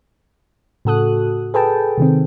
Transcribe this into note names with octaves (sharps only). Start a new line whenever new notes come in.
A2 C#3 F#4 A4 D#6 F#6
G#4 A4 B4 G5 A5
C3 D#3 C4